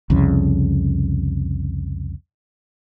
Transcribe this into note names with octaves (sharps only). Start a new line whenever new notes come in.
C2 F2 C#3